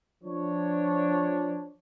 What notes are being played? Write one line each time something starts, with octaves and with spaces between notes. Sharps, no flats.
F3 D4 C#5